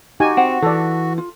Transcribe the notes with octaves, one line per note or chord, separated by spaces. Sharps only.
D#4 F#4 G4 G#5
C4 F#5
E3 A4 D5
F4